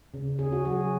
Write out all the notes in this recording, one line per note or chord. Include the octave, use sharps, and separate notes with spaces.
C#3
C#4 G#4
F#4
F#3 G#4